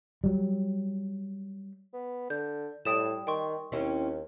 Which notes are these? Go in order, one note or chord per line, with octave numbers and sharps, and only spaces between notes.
F#3 G3
B3
D3 G6
A2 G3 G5 D#6 E7
D#3 G5 C6 C#6
D#2 C4 C#4 E4